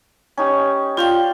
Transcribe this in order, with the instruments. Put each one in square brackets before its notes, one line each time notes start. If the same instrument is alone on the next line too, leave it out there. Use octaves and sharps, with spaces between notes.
[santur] C#4 D#4 G4
[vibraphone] F4 F5 G5 [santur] C5 D5